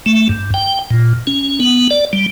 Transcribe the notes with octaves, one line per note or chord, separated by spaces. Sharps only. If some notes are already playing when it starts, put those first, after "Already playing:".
A3
G2
G5
A#2
C#4
B3
D5
G3